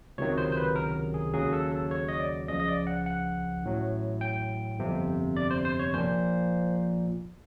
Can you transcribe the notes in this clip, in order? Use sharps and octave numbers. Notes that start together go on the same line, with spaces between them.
C#2 C3 D#3 F#3 C#5
C5
C5
B4
A#4
G#4
D#2 C#3 F#3 G#4
A4
A4
C#5
D#5
D5
C#2 C#3 F3 D#5
D#5
D5
F#5
F#5
A1 A2 F#3
G5
G1 F2 C3
D5
C5
C5
C#5
A#1 A#2 F3 C5